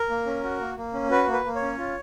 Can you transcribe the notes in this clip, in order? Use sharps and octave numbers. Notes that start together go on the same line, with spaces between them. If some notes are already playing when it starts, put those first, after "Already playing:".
Already playing: A#4
A#3
C#4
F#4
A#3
A#3
C#4
F#4 B4
A#3
B4
A#3
C#5
C#4
F4